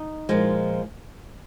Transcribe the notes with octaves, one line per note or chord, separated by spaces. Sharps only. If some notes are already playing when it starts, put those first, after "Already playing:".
Already playing: D#4
A#2 F3 G#3